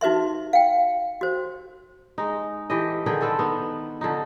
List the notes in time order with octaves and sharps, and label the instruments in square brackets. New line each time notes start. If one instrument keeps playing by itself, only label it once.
[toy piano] D#4 F#4 B4 E5 C6
F5 G5
F#4 C5
[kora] G#3 D#4
E3 A3 G4 D#5
D3 D#3 G#4 G5
C4 D4 A4 B4
D#3 B3
D3 F3 D#4